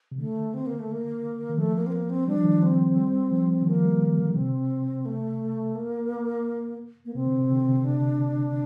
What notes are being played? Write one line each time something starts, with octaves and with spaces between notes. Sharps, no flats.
C3
D3 A3
C4
A#3
A3
A#3
D#3
F3 A3
A#3
C4
A#3
C4
G3 D4
F3
D#3
F3
C4
G3
F3
D#3
F3 A#3
G3
D#3
D3
C3 C4
A3
A#3
A#3
C3 C4
D3
C3
D3
C3
D3
D4
C3